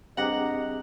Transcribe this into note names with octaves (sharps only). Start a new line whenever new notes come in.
G2 C4 G4 G#4 D#5 F#5 A#5